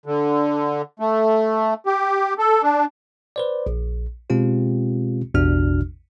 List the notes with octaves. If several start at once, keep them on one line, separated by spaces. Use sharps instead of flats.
D3
A3
G4
A4
D4
B4 C5 D5
A#1
B2 G#3 C4 F4 G4
A1 E2 B2 D4 F#4 F6